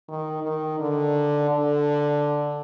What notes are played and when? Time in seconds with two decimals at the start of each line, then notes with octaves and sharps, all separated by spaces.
0.09 D#3
0.43 D#3
0.79 D3
1.50 D3